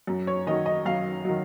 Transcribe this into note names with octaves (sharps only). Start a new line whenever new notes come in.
F#2
C#5
D#3 F#3 D#5
D#5
F#2 F5
D#3 F#3